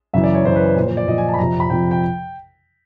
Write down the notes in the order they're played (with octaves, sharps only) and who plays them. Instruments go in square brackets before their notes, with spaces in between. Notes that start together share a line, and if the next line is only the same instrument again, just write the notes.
[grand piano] F#2 C#3 E3 E5
D5
C#5
F#2 C#3 E3 C5
B4
B4
A#2 C5
F3
C5
D5
A#2 F3 D#5
G#5
A5
B5
F2 C3 F3 A#5
B5
F2 C3 F3 G5
G5